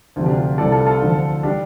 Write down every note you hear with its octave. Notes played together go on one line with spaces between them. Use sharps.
D2 C3 F3
D4 G4
F4
C2 C3 G3 A4 D5
F4 A4
F4 A4
D2 D3 F3
G3 D4 G4